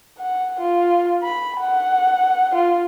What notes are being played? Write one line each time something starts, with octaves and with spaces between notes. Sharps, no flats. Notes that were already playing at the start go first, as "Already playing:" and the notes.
F#5
F4
B5
F#5
F4